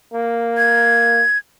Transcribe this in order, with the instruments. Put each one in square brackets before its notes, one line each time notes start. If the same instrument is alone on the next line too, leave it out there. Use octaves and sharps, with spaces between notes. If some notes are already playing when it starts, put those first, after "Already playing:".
[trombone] A#3
[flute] G#6